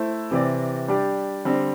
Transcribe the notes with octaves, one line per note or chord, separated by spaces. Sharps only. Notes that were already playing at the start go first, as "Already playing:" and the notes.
Already playing: A3 E4 C5
C3 E3 C4 G4 D5
G3 D4 G4 D5
D3 G3 C4